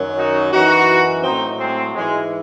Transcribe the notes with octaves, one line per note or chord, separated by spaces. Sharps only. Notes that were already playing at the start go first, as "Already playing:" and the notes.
Already playing: F#2 D#3 F#3
D#4 F#4
F#2 E3 D#4 F#4
A2 F#3 C4 D#4
G#3 C4
G#2 E3 G#3